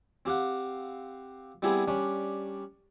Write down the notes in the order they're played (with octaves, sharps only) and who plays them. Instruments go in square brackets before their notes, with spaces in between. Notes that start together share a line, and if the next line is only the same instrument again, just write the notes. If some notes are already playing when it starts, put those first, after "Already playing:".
[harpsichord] C4 G4 F5 F#5
G3 B3 C4 E4 G4 G#4
G3 C#4 D4